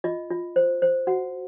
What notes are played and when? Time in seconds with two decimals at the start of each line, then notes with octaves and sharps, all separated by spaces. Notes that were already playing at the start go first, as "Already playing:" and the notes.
0.04 F4 D#5
0.30 F4
0.56 C5
0.82 C5
1.07 F#4 F#5